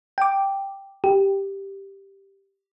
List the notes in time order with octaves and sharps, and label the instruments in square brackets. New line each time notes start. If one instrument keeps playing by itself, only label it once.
[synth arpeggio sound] G5 D6
G4